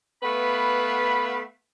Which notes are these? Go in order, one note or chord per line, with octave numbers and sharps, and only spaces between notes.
A3 B3 B4 F5 B5